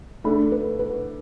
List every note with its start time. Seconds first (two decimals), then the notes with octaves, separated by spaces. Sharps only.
0.24 A3 D4 B5
0.52 B4
0.79 B4